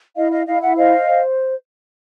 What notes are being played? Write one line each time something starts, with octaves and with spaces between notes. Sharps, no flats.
E4 D#5 F5
D#5 F5
E4 D#5 F5
E5 F#5
C5 D#5 F5
C5